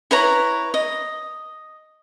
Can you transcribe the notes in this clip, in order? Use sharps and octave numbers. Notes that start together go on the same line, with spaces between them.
E4 B4 C#5 A#5
D#5